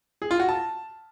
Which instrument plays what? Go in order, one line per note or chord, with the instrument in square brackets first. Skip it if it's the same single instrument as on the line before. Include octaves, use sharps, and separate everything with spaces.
[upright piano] G#4
F4
F#4
A5